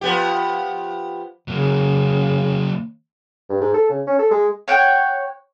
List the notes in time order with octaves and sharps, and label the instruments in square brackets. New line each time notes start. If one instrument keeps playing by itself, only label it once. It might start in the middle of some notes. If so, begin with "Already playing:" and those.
[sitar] F3 B3 G4
[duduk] C#3 [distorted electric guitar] F#3 A#3
[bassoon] G2
G#2
A4
C#3
C#4
A4
G#3
[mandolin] C#5 F#5 G5